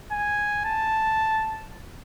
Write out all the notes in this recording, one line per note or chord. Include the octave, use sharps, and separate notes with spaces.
G#5
A5